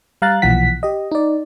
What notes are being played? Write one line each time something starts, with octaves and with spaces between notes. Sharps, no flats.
G3 F5 A#5 F#6 A6
B1 A#2 E3 F3 F#5 B6
G4 D#5
D#4 D5